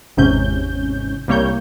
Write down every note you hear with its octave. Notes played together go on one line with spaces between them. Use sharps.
G#1 E2 G#2 C3 C#4 G6
C2 G3 A#3 C#5 G6